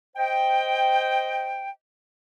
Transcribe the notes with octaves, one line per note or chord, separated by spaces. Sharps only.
C5 D#5 G5